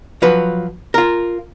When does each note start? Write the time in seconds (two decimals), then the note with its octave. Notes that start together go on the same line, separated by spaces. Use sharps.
0.22 F3 F#3 B4
0.94 F4 A#4